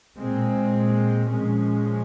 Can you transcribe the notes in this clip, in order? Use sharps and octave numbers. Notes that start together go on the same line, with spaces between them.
A#2 G#3 C4
A#2 F3 G#3 C#4